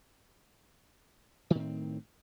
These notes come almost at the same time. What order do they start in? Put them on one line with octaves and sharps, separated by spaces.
D#3 A2 C4